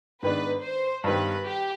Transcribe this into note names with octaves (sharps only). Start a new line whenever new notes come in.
G#2 D#3 B3 D4 B4
C5
G2 D#3 G3 B3 B4
G4